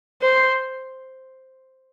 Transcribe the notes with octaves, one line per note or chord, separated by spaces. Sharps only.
C5